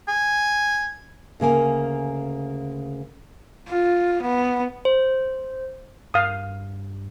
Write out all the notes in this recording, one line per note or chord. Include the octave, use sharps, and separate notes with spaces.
G#5
D2 C#3 A#3 G#5
F4
B3
C5
G2 F5 D#6